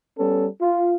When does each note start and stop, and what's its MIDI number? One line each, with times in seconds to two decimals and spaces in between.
0.19 0.48 55
0.19 0.48 59
0.19 0.48 61
0.19 0.48 69
0.61 0.94 65